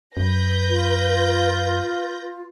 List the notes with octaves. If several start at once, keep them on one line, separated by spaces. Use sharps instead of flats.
F#2 B4 G6 A#6
F4